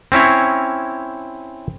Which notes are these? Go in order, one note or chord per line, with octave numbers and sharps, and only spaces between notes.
C4 C#4 E4 C#5